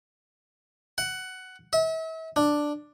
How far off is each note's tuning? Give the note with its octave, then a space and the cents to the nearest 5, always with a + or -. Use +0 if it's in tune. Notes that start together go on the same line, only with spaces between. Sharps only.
F#5 +10
E5 -40
D4 +5